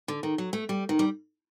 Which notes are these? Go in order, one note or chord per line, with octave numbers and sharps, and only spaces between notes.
D3
D#3
F#3
A3
G3
D#3
G3